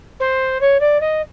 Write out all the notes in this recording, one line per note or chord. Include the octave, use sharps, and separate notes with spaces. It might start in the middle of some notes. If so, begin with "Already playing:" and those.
C5
C#5
D5
D#5